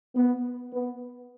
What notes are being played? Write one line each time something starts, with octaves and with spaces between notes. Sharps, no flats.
B3
B3